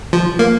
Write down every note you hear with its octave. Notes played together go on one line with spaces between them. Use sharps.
F3
A#3